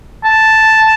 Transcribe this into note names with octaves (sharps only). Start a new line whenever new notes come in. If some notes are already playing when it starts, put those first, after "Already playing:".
A5